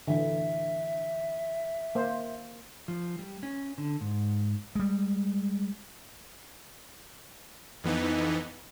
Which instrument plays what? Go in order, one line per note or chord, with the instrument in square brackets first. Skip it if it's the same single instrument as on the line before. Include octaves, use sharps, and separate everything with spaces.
[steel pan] D3 E3 [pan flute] E5
[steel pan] A#3 C5
[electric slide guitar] F3
G3
C#4
D3
G#2
[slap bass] G3 G#3
[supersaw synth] F2 E3 B3 D#4